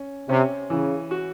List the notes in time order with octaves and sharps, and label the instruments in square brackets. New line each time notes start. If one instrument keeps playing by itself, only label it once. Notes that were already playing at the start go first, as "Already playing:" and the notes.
Already playing: [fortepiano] C#4
[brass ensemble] C3 [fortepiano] C#4
[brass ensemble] C#3 [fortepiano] E3
[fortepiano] F#4